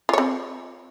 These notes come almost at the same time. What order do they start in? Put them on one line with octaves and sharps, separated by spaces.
F4 C#5 C4